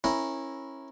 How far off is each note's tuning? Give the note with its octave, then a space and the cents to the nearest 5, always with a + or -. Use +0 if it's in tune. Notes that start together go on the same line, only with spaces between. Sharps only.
C#4 -25 E4 +0 A#4 +0